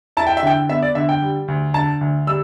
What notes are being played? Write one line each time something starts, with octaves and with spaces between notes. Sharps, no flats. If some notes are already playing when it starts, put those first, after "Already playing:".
E4 A5
G5
E5
D3 G5
B3 E5
D5
D3 E5
G5
G3
D2
D3 A5
D2
G3 E6